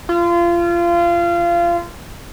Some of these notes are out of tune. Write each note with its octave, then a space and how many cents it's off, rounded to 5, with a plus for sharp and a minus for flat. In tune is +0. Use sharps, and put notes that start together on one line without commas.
F4 -25